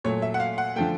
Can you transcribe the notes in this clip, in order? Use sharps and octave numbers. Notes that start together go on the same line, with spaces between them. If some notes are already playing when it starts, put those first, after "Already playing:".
A#2 F#3 A3 C#5
E5
F#5
F5
F#5
D3 F3 A3 G5